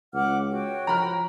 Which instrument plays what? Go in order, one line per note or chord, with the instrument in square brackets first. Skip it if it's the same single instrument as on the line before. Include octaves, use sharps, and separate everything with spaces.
[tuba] C#2 [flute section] F#5 D6 F6
[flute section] F#4 C#5 G5
[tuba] F3 [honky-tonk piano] A#5 B5 F6